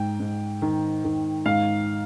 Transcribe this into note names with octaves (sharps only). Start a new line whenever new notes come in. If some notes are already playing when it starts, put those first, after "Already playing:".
Already playing: G#2 G5
G#2
D#3
D#3
G#2 F5